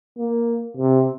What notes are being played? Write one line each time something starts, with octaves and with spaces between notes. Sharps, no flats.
A#3
C3